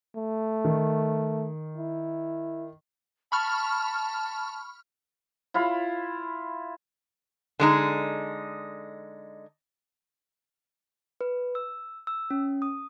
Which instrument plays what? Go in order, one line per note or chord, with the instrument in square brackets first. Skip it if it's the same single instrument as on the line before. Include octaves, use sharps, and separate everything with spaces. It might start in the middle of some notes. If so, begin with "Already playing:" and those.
[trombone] A3
[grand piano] D#3
[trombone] E4
[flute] A5 [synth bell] B5 C#6 F6
[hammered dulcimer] E4 F4 F5 B5
[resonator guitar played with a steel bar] D3 G#3 D#4
[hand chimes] B4
E6
E6
C#4
D#6